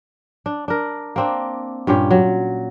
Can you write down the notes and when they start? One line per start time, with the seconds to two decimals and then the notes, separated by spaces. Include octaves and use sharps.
0.46 D4
0.68 D4 A#4
1.16 A#3 C4 D4
1.87 G2 A#2 C#4 G4
2.11 F#3